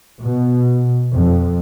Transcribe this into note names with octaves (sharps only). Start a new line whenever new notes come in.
B2
F2